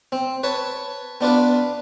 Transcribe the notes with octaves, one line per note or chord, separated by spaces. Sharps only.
C4
B4 C#5 A5
B3 D4 F4 B4